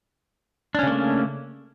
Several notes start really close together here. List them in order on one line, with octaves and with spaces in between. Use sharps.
D4 C#4 C#3 A#3 A3